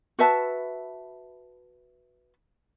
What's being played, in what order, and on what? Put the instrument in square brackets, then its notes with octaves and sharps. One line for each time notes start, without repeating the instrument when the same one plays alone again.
[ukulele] F#4 B4 E5 A5